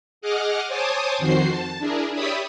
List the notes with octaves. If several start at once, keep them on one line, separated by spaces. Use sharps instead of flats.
G#4 D#5 F#5 D6 F6
C5 C#5 G#5 A5 D6 D#6
F2 D#3 F#4 C5 C7
A5
D4 E4 G#4 A#4
G4 C#5 D5 E5 B5 D#6